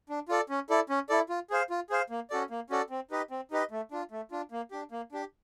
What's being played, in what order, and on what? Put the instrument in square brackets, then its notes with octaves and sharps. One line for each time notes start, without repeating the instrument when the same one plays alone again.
[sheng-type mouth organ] D4
F4 A4 D5
C#4
E4 A4 D5
C#4
E4 A4 D5
F4
G#4 C5 F5
F4
G#4 C5 F5
A#3
C#4 F#4 A4 D5
A#3
C#4 F#4 A4 D5
C4
D#4 G4 B4 D#5
C4
D#4 G4 B4 D#5
A3
D4 F4
A3
D4 F4
A#3
D4 G4
A#3
D4 G4